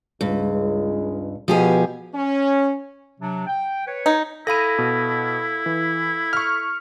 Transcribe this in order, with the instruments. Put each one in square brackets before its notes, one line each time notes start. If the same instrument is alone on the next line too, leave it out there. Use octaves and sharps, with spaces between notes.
[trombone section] C#2 G#3 [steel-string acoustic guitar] G2
[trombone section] B2 [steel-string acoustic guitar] F3 G4 G#4
[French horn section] C#4
[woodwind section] C3 F#3 D4
G5
B4 C#5
[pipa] D#4
[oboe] E4 [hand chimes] A4 F5 B5 [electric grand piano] A#6 D#7
[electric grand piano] B2
E3
C#6 F6